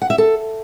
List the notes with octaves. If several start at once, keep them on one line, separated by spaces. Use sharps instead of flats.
F#5
E5
A4